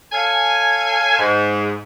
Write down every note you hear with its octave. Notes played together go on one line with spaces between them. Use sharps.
A4 C#5 F5 G#5
G#2